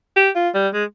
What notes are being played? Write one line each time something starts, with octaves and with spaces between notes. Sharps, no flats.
G4
F4
G3
G#3